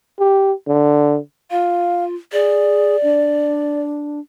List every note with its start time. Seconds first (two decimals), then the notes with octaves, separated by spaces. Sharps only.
0.19 G4
0.68 D3
1.51 F4 F5
2.33 G#4 D5
3.03 D4